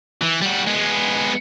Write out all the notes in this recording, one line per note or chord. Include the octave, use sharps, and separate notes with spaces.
E3
G3 F#4
G#3 B3